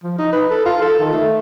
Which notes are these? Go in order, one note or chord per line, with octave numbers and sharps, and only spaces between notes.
F3
D#4
B4
A4
F4
A4
D#3
A3